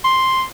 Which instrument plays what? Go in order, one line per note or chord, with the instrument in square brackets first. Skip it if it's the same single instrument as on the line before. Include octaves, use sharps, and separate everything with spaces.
[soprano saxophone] C6